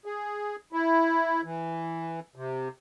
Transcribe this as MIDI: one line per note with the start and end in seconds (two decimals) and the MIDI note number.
0.06 0.56 68
0.73 1.41 64
1.44 2.20 52
2.35 2.68 48